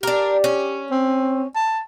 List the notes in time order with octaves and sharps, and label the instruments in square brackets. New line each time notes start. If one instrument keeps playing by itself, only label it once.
[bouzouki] D4 A#4 [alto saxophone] G4
[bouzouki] C#4
[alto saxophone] C4
A5